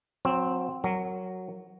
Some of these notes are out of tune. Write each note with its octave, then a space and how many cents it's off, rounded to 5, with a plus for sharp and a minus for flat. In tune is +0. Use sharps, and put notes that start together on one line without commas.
F#3 -30 C4 +0
F#3 +0 A#4 -20